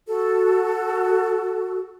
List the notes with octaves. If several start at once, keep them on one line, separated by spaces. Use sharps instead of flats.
F#4 A4